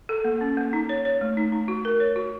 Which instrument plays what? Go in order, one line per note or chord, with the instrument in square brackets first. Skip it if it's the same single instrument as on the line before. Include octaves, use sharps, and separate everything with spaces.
[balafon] A4
A#3
C#4
A#3
D#4
C#5
C#5
A3
D#4
D#4
F#4
A#4
C#5
F#4